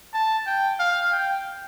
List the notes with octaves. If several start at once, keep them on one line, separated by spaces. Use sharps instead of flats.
A5
G5
F5
G5